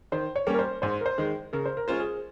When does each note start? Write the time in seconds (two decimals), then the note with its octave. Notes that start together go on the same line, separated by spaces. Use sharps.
0.12 D#3 C5
0.36 C#5
0.47 G3 A#3 C#4
0.54 A#4
0.59 C5
0.82 G#2 C5
1.01 A#4
1.06 C5
1.18 D#3 G#3
1.53 C#3 A#4
1.65 C5
1.77 A#4
1.88 G#3 C#4 F4 C5
2.00 G#4